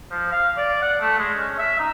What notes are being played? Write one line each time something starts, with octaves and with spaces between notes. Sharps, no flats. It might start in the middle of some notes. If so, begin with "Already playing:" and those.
F3
F5
D5
F#5
A3
G#3
C#4
E5
D#4